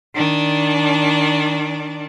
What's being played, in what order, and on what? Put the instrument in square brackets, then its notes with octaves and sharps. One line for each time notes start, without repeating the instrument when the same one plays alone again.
[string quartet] D#3 D4 D5